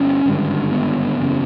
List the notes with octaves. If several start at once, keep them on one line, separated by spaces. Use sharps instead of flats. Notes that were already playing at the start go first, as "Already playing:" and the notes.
Already playing: G1 C#4
G#1 G2 D3
B3
F#1 E2 C#3